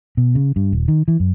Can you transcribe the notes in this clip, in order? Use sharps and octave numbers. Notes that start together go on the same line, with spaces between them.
B2
C#3
G2
D#1
D#3
E3
F#2